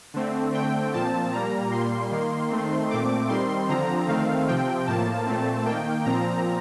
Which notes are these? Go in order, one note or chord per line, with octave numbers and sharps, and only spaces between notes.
D3 A3 C4
D3 A3 C4 G5
A#2 F3 C4 A5
A#2 G3 A#3 A#5
A#2 G3 A#3 C6
D#3 A#3
D#3 A3 C4
A#2 A3 C4 D6
D#3 G3 C4 C6
D3 F3 C4 A#5
D#3 A3 C4 F5
C3 F3 C4 G5
A2 F3 A#3 A5
A#2 A3 C4
D#3 A#3 G5
A#2 F3 C4 A#5